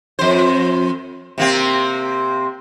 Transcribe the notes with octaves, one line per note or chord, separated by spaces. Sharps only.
F2 C5
C3 A#3 C4